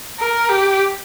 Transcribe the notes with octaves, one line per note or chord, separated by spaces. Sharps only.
A#4
G4